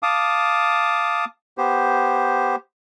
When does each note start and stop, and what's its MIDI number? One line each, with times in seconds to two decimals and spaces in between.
0.03 1.25 77
0.03 1.25 81
0.03 1.25 86
0.03 1.25 87
1.58 2.56 59
1.58 2.56 67
1.58 2.56 72